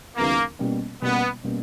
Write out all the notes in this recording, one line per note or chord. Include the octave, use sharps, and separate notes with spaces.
D#2 C#3 F#3 A#3 B3 E4
B2 G3 A#3 C#4
B2 G3 A#3 B3 C#4
B2 G3 A#3 C#4